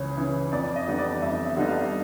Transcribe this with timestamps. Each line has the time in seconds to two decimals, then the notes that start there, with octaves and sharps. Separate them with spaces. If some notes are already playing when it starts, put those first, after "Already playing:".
Already playing: C#2 C#3 E3 C#5
0.17 C#3 E3
0.52 F2 D5
0.76 D#5
0.87 D3 G3 B3 D#4
0.99 D5
1.22 F2 E5
1.45 E5
1.57 D3 G3 B3 D#4 F#5
1.68 F5